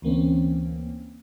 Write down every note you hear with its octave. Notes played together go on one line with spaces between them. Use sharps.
D2 E3 A#3 C4 C#4